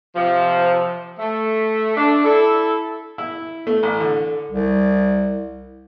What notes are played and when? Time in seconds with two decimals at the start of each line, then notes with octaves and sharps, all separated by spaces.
0.15 C3 F3
1.18 A3
1.97 A3 D4
2.25 E4 A4
3.18 E4
3.67 A3
3.83 A1
4.00 D3
4.51 C2